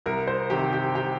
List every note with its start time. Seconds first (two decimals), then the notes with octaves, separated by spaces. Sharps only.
0.06 C2 A#4
0.27 C5
0.50 C3 D#3 G4 G5
0.72 G4 G5
0.95 G4 G5